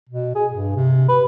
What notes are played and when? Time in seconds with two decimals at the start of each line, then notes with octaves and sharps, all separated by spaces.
0.09 B2
0.35 G#4
0.52 G2
0.76 C3
1.08 B4